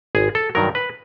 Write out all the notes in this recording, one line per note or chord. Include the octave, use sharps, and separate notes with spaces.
G#1 G#4
A4
G2 D#3 F#3 A#4
B4